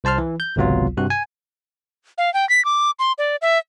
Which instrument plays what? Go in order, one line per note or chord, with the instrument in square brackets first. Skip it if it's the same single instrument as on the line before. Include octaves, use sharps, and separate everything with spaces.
[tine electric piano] C2 C5 A5 C6 F6
E3
G6
G#1 C#2 C3 F#3 B3 F4
G2 C3 F#4 F#6
G#5
[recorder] F5
G5
B6
D6
C6
D5
E5